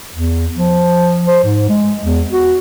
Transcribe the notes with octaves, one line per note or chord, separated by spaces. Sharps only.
E2
F3
C5
G#2
G#3
E2
F#4